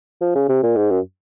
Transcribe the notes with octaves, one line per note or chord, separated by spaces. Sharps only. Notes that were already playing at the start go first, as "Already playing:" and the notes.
F3
C#3
C3
A#2
G#2
F#2